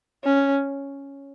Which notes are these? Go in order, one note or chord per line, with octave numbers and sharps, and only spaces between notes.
C#4